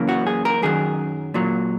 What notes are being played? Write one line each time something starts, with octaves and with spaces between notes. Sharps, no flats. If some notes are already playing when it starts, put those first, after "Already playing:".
Already playing: F#2 C#3 E3 A#3
F#4
G#4
A#4
F#2 D#3 F#3 G#4
A#2 F#3 A#3